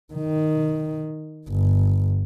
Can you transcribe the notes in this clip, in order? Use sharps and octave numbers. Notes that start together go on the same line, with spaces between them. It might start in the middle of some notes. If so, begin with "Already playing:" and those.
D#3
G1